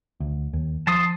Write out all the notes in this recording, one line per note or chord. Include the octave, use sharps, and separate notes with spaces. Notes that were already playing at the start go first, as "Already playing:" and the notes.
D2
D#2
F3 A5 C6 D#6